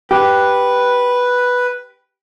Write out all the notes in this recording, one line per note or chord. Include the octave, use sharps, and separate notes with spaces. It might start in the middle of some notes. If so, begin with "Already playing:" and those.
G4 B4